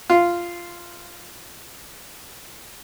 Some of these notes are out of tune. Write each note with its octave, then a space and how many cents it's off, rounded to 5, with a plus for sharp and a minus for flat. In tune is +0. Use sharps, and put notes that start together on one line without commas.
F4 -10